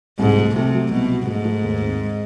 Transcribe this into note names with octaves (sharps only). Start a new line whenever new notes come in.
C2 G#2
A3
C3 A3
F#3
C2 B2
F#3
G#2 A3
A3
D#2
C4
G#3